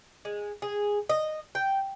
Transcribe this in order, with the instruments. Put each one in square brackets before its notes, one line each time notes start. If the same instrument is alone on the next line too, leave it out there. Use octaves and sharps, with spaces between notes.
[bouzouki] G#3
G#4
D#5
G5